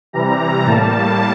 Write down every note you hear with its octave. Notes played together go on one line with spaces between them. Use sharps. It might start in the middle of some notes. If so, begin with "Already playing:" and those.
C3 E3 G3 A#5
A2 G3 A#3 A5